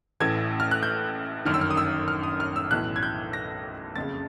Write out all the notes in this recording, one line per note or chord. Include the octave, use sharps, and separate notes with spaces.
A1 A2 E3 G#6
F6
F#6
G6
G1 F#2 D#3 F6
E6
F6
D#6
E6
F6
D#6
F6
E6
B1 A2 E3 F#6
G#6
G6
A#6
F#1 F2 C#3 A6